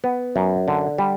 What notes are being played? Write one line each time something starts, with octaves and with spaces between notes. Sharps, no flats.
B3
F#2
D3
G3